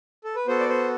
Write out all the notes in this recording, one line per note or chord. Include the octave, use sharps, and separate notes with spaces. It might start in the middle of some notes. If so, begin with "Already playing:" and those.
A4
B4
B3 F#4 A4 C5
D5
C5